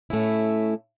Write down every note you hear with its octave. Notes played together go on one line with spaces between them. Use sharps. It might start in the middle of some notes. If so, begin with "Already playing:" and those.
A2 A3 C#4 E4